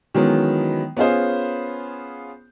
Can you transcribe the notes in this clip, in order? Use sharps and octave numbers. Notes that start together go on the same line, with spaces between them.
D#3 E3 F#3 G#3 B3 C#4
B3 C#4 F4 G#4 C5